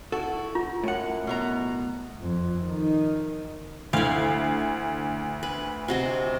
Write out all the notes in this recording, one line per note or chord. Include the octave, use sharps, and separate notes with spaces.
E4 F#4 A4
F4
F#2 A2 F#5
B2 B3 A#5
F2
D#3 D#4
D2 E4 F5
B4
C3 F#4 D#5